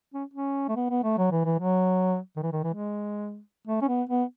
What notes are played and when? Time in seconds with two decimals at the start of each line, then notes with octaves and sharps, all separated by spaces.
0.14 C#4
0.34 C#4
0.68 A3
0.76 B3
0.90 B3
1.04 A3
1.18 F#3
1.32 E3
1.45 E3
1.59 F#3
2.36 D#3
2.43 E3
2.52 D#3
2.64 E3
2.74 G#3
3.67 A3
3.82 C#4
3.88 B3
4.09 B3